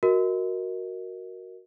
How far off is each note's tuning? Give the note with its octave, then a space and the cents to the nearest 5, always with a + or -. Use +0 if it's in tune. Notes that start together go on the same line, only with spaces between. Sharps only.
F#4 +0 A#4 +0 D#5 +30